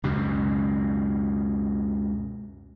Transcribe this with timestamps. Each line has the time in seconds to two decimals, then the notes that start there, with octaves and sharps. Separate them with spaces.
0.03 C#2 F#2 B2